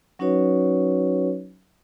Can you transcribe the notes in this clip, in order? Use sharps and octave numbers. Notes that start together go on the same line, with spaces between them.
F#3 C#4 D#4 F#4 B4 C#5